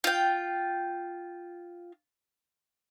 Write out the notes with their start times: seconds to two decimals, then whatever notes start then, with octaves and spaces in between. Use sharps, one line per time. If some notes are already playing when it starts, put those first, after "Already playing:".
0.04 F4 G5